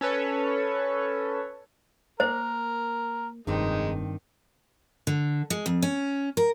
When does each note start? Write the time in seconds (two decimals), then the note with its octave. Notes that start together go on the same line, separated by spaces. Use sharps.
0.01 C#4 A4 B4 C#5
2.20 A#3 A#4 C5
3.47 F1 G2 D#3 G#3 C4 D#4
5.07 D3
5.50 G#3
5.66 F2
5.82 C#4
6.37 A#4